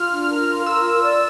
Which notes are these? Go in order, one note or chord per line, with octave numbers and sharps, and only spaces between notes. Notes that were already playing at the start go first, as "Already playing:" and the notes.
Already playing: F4 F6
D4
A#4
F4
A#4 E6
F4
D5